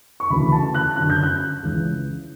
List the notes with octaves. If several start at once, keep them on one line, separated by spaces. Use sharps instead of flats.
C#6
D2 C#3 E3 B5
A5
F#6
F#2 D3 F#6
G6
F#6
C#2 C#3 E3